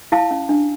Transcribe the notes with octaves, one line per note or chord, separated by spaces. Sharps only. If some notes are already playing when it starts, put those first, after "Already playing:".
E4 F5 A5
C#4
D4